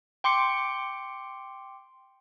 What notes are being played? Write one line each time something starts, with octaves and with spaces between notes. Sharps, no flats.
G5 C6 D6 C#7